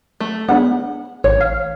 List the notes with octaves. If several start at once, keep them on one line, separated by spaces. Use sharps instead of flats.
A3
G#3 B3 D4 F#5
A1 C#5
F5